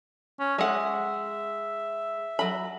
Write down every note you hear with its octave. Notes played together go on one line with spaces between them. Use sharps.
C#4
G#3 E5 F#5
F#3 B5